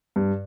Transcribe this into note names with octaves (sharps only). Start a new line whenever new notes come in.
G2